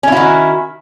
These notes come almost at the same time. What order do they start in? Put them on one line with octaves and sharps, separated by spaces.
C#4 E4 F#4 D#3